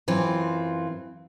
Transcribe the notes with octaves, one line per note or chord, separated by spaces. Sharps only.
F#2 E3 C4 F4